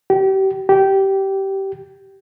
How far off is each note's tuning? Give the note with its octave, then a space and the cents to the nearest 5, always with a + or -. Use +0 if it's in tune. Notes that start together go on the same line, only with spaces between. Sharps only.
G4 -30
G4 -15